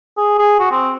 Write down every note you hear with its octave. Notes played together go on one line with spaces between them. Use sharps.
G#4
G#4
F#4
C4